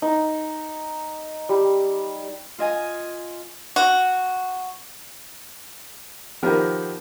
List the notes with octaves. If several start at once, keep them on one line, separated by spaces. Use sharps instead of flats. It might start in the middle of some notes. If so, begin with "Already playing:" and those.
D#4
G3
F4 D#5 G#5
F#4
D#3 F3 B3 G4 A#4